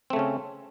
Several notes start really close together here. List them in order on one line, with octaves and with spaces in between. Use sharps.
C4 A3 C#3 C#4